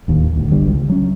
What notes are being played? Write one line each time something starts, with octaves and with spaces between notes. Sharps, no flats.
D1 D#2
D1 D2
G1 C2 D3 G3
C#2
F#3 C#4